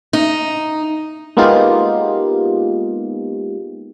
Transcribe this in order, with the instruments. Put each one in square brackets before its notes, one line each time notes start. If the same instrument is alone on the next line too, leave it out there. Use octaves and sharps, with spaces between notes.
[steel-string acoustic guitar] D#4
[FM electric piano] G#3 A#3 B3 D#4 F4 G4